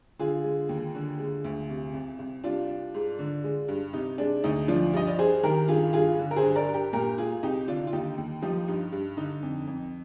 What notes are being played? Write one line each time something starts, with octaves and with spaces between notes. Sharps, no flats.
D3 F4 G#4
G#3
D#2
D3
G#3
D2
C3
C2
C2
G3 D4 F4
G3
G#2
D3
G#3
G2
C3 D#4
G#3 D4
D2 D#4
F3 D4 F4
G2 D#5
D5
G2 G#4 C5
D#3 G4 A#4
G2 F4 G#4
G2 F4 G#4
D3
A#4
G#4 C5
G2
A#4 D5
G2
G4 A#4
A#2 G4 A#4
G#3 F4 G#4
C2 D#4 G4
D3 D4 F4
F4
D#2 D#4 G4
D#2
F3 D#4 G4
G2 D#4
G2
D3 D#4
F2
F2